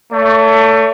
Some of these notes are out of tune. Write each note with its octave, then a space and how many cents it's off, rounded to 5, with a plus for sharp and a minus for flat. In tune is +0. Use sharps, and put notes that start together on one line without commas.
A3 +20 C#5 +40